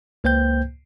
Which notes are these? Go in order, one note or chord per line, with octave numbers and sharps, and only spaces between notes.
C#2 A#3 C5 G5 G6